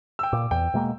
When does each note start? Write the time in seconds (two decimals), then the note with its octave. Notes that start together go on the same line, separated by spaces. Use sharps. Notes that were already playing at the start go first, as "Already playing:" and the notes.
0.19 G5 E6
0.33 A#2 D6
0.51 E2 G5
0.74 B2 G#3 A#3